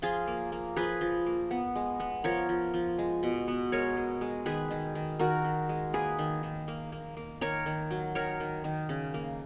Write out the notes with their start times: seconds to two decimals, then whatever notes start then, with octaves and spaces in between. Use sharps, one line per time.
0.02 F3 F4 G#4
0.27 A#3
0.52 A#3
0.76 F3 G#4 B4
1.01 F3
1.26 A#3
1.51 B3
1.76 G#3
2.00 B3
2.24 F3 A#4 C#5
2.49 F3
2.74 F3
2.98 G#3
3.23 B2
3.48 B3
3.72 G#3 A#4 C#5
3.97 G#3
4.21 G#3
4.46 D#3 G#4 B4
4.71 D#3
4.95 D#3
5.19 D#3 F#4 A#4
5.44 D#3
5.69 G#3
5.93 A#3 G#4 B4
6.19 D#3
6.43 D#3
6.68 A#3
6.92 A#3
7.17 A#3
7.41 D#3 A#4 C#5
7.66 D#3
7.91 F#3
8.15 D#3 A#4 C#5
8.40 D#3
8.64 D#3
8.89 C#3
9.14 A#3